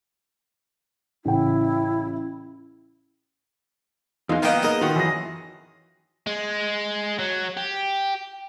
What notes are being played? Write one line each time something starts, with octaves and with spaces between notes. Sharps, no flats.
A1 C#3 E4 G5
E2 G#3 A#3 D#4 F4
D#3 A#3 B3 D#5 F5 G5
G#4 A#4 D#5
D#3 F4 F#4
F#2 E3 G#4 A#6
G#3
F#3
G4